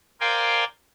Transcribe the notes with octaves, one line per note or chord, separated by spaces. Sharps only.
A#4 C5 D5 F5 G5 G#5